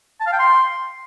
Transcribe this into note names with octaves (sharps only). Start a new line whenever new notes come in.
A5
F5
G5
C6